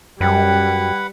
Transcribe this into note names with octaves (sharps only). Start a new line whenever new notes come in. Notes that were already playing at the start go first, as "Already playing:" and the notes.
F#2 G3 B4 F#5 G5 B5 G#6